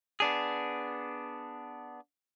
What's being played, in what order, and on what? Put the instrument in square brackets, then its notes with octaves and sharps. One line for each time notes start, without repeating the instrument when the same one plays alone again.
[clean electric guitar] B3 D4 G#4